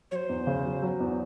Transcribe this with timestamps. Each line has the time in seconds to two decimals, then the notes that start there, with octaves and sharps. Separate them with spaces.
0.11 F#3 C5 C#5
0.29 E2
0.47 C#3
0.65 F#3
0.82 F#3
1.00 E2